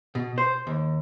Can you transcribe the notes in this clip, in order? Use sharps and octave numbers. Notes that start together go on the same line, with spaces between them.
B2
C5
D#2